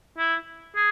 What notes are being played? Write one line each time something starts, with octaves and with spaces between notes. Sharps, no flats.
E4
G#4